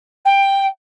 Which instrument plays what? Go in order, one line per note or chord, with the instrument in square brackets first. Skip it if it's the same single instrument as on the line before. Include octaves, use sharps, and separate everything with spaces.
[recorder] G5